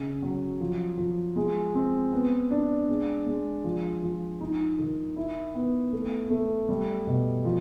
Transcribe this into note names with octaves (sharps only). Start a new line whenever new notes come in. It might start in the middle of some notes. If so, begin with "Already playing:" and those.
Already playing: C#3
F#3
F3
F3
G#3
C4
B3
D4
G#3
G#3
F3
F3
D#4
D#3
E4
B3
A3
A3
G3
B2
F3